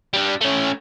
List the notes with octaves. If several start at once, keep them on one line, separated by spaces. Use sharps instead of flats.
G3 D4
A3 C#4